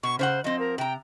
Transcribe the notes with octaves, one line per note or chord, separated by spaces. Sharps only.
B2 C#6
C#3 C5 C#5 F#5
F3 C4 D#5
A#4
C3 G5 A#5